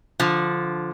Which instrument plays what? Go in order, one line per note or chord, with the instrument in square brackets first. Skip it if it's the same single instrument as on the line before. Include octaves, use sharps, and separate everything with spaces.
[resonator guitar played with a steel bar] D3 F3